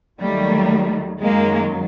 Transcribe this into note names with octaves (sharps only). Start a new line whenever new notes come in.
D#2 D#3 F#3 G3 A3
F#2 D#3 F#3 G#3 A#3